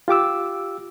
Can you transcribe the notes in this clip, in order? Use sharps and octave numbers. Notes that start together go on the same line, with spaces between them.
F4 G4 D6 E6